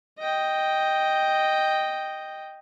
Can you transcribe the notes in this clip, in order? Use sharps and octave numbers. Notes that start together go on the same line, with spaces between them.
D#5 G5